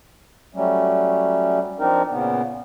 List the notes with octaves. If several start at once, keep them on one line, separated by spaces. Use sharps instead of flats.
F#3 G3 A3 C#4
F3 C4 D4 D#4 A#4
A#2 C#3 B3